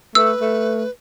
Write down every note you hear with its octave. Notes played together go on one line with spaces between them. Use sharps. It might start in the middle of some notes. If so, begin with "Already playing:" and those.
A3 B4 E6
A3